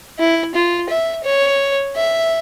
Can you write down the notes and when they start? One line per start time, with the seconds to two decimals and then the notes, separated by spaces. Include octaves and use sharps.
0.19 E4
0.55 F4
0.89 E5
1.25 C#5
1.96 E5